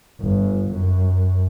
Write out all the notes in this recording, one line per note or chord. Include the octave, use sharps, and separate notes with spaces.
G1
F#2